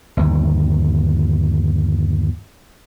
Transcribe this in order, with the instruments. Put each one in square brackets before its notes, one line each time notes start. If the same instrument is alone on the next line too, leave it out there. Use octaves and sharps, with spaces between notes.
[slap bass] G1 D#2